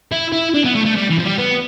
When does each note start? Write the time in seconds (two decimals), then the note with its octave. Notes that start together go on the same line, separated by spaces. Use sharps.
0.12 E4
0.32 E4
0.54 D4
0.64 B3
0.75 A3
0.86 A3
0.96 G3
1.10 E3
1.19 F3
1.25 G3
1.38 B3